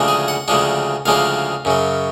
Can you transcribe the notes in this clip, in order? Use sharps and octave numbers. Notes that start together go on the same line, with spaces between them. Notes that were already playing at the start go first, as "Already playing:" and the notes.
Already playing: D2 C#3 F3 G#3 D4
G#4
F#5
D2 C#3 F3 G#3 D4
D2 C#3 F3 G#3 D4 F5
F#2 C#3 F#3